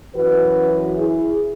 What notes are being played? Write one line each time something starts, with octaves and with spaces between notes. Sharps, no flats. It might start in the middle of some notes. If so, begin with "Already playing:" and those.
F#2 E3 F#4 B4
E4 G#4